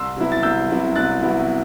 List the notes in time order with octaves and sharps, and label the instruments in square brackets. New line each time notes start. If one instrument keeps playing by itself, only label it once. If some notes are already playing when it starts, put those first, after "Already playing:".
Already playing: [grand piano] C2 C6 E6
C3 F#3 B3 E4
A6
C2 E6 G6
C3 F#3 B3 E4
C2 F#6 A6
C3 F#3 B3 E4